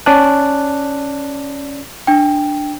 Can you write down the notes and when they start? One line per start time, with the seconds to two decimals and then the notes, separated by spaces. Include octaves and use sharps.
0.06 C#4 D5 A5 F#6
2.07 D4 G5